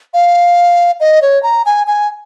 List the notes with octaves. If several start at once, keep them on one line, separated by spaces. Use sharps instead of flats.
F5
D#5
C#5
A#5
G#5
G#5